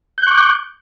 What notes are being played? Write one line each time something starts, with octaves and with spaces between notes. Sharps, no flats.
C#6 D6 F#6 G6